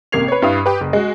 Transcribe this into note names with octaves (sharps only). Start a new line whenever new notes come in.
A1 C3 A#3 G#6 C7 F7
B4 C#5
G2 E4 B4 F5 D#6
G4 B4
F#1
G#3 F#4